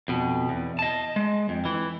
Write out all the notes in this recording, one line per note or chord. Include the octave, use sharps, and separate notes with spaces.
F2 B2
E2
D#5 A5
G#3
F2
E3